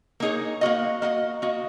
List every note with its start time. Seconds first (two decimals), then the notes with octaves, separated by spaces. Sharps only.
0.20 A#3 D#4 G#4 C#5
0.61 A#3 F#4 D#5
1.02 A#3 F#4 D#5
1.42 A#3 F#4 D#5